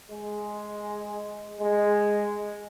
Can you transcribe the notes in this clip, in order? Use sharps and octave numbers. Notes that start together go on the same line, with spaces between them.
G#3
G#3